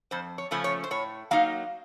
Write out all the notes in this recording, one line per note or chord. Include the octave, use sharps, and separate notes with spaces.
F2 C5
C#5
C#3 F3 A3 C#4
C#5
C5
A2 C#5
F#3 A#3 D#4 F5